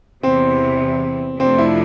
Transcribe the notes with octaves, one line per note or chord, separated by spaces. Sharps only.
E2 C3 E3 C4
F2 C3 F3 A3 C4 D4
E4